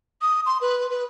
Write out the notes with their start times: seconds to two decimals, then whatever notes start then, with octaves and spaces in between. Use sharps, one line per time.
0.22 D#6
0.46 C6
0.61 B4
0.90 B4